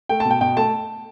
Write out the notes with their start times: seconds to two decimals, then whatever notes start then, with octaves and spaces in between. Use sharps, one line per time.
0.09 A3 G5
0.20 A5
0.25 B2
0.31 G5
0.41 B2 G5
0.57 A3 A5